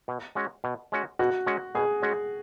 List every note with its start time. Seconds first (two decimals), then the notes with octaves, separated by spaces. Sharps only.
0.08 B2
0.35 G#3 C#4 F#4
0.64 B2
0.92 G#3 C#4 F#4
1.19 B2 F#4
1.47 G#3 C#4 F#4
1.75 B2 G#4
2.02 G#3 C#4 F#4